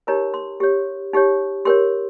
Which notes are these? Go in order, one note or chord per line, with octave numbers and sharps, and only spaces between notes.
D#4 G4 A#4 C#5 A#5
C6
G4 C#5
D#4 G4 C#5
G4 A#4 C#5 C6